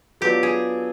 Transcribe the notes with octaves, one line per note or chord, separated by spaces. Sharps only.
F#3 B3 D4 F4 G4
G#4